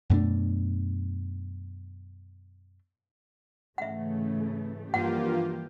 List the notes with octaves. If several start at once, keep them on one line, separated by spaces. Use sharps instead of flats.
F#2 B2 A3 D4
G#2 C#3 E3 A3 E5 F#5
G2 E3 F3 A#3 F4 G4 F#5